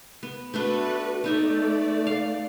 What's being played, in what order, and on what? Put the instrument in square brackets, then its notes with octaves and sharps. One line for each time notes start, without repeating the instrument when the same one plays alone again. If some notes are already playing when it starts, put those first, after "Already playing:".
[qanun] B3
[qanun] A3 B3 D4 [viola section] F#4 A4 B4
[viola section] A3 D5 [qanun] B3 D#4 E5
[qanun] F5